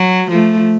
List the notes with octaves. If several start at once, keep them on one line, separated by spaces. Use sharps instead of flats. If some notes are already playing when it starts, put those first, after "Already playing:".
Already playing: F#3
F3 A3